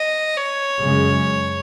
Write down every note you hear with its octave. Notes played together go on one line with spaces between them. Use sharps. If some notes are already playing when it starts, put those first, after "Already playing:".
Already playing: D#5
C#5
F#2 C#3 G#3